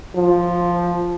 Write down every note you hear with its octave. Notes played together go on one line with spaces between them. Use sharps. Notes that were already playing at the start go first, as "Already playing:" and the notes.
F3